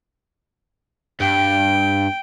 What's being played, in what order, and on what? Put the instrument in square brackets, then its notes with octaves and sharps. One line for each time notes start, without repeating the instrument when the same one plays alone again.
[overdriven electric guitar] G2 [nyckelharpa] G5